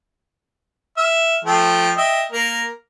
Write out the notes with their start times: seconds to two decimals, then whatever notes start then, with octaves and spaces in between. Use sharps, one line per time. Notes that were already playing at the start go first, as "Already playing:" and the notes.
0.97 E5 F6
1.45 F3 A3 G5
1.97 D#5 E5 G5
2.32 A#3 A#4